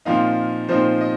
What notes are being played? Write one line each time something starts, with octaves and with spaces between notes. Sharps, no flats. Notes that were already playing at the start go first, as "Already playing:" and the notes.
A#2 F3 C4 D#4 F5
A#2 F3 C4 D#4 C5
D#5